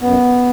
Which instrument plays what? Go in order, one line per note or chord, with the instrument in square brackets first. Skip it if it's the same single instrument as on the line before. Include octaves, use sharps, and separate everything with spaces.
[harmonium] F#2 B3